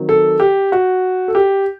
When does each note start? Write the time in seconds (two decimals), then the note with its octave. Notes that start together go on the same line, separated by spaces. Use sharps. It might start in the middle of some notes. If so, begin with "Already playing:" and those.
Already playing: D#3 F#3 C4
0.09 A4
0.40 G4
0.72 F#4
1.28 A4
1.35 G4